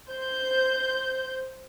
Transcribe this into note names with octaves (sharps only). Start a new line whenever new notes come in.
C5 G6